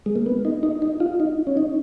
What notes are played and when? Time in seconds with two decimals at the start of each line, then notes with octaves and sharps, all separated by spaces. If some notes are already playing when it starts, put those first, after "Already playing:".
0.06 G#3
0.16 A#3
0.26 B3
0.45 D#4
0.63 D#4
0.82 D#4
1.00 F4
1.20 D#4
1.47 C#4
1.57 D#4